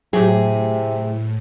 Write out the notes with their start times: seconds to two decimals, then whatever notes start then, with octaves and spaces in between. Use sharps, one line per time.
0.13 A2 C3 F#3 G4 G#4